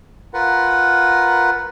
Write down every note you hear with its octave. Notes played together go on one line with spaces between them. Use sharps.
F4 A#4 B4 F#5